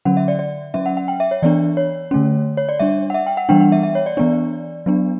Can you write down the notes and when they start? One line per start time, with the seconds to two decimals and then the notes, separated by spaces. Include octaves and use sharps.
0.05 D3 F#3 C#4 F#5
0.17 E5
0.28 D5
0.39 D5
0.74 F#3 C#4 E5
0.86 F#5
0.97 F#5
1.08 G5
1.20 E5
1.31 C#5
1.42 E3 B3 D4 D5
1.77 C#5
2.11 D3 A3 C#4
2.57 C#5
2.69 D5
2.79 G3 D4 E5
3.10 F#5
3.14 E5
3.27 G5
3.37 F#5
3.49 E3 G3 B3 D4 G5
3.60 F#5
3.72 E5
3.83 E5
3.95 C#5
4.06 D5
4.17 E3 B3 D4 D5
4.86 F#3 B3 D4